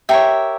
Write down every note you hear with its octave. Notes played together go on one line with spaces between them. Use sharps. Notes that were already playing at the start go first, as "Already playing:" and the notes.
G4 A#4 C#5 E5